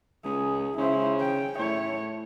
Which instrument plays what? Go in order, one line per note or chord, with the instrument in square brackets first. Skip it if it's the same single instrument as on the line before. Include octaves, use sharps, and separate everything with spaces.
[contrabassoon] C#2 [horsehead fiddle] G#4
[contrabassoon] C#3 [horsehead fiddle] E4 C5
[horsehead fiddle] G5
[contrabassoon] A2 [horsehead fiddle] A3 C#5